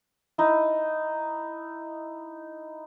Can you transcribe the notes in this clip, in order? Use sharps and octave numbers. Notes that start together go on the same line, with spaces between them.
D#4 E4